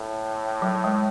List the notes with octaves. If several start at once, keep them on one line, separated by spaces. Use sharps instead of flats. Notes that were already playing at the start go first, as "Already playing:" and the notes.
Already playing: A2
F#3
G#3